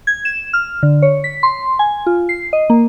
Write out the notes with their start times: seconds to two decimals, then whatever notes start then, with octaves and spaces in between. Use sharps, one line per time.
0.07 G#6
0.25 E7
0.53 F6
0.83 D3
1.02 C#5
1.24 B6
1.43 C6
1.79 G#5
2.06 F4
2.29 C7
2.53 D#5
2.70 A#3